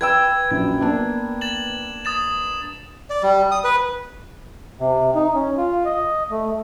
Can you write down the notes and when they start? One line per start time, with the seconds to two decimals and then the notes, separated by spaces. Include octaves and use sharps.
0.01 B4 G5 E6 G#6
0.51 A#1 F#2 G#6
0.80 A#3 B3 D4
1.41 A6 E7 F#7
2.05 D#6 A6 E7
3.10 D5
3.23 G3
3.51 D#6
3.64 B4
4.80 C3
5.16 D#4
5.35 C#4
5.58 F4
5.85 D#5
6.31 A3